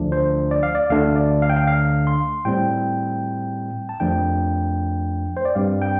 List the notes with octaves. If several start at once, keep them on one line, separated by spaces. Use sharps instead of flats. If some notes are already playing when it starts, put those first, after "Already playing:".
Already playing: D2 D3 F3 A3 D4
C5
D5
F5
D5
D2 D3 A3 D4 F5
D5
F5
G5
F5
F5
C6
A2 G3 C4 G5
A5
F2 F3 A3 D4 G5
C5
D5
G2 G3 C4 F5
G5